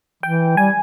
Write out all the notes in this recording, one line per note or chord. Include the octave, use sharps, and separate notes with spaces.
E3 G5
G3 G#5